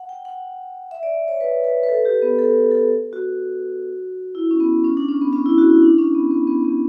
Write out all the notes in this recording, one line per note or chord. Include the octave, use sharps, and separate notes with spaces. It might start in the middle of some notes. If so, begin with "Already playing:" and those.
Already playing: F#5
G5
F#5
E5
D5
C#5
B4
B4
B4
A4
G4
B3
A4
A4
F#4
E4
C#4
B3
C#4
D4
C#4
B3
C#4
E4
F#4
E4
D4
C#4
B3
B3
B3
B3